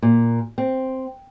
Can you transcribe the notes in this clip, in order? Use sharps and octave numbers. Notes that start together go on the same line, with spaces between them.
A#2
C4